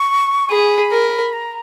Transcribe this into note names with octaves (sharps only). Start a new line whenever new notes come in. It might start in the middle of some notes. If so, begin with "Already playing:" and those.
Already playing: C#6
G#4 B5
A#4
A#5